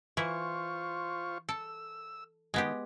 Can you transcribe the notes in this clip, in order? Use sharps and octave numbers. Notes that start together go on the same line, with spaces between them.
E3 E4 F4 C5 C#6
A4 E6
D#3 G#3 B3 G4